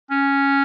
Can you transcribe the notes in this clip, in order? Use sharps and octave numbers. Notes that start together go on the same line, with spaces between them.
C#4